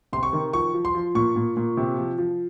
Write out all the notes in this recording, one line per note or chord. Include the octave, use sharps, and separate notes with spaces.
C3 C6
C#6
D#3
F3 C#6
F3
C6
F3
A#2 C#6
A#2
A#2
C3
F3
F3